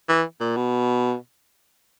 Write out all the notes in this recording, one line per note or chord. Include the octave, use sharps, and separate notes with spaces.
E3
A#2
B2